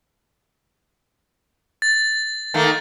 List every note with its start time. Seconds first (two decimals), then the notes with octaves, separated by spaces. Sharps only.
1.82 A6
2.54 D#3 A3 A#3